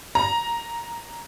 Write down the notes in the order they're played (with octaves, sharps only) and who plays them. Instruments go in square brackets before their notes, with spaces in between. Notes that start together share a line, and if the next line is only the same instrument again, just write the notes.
[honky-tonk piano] A#5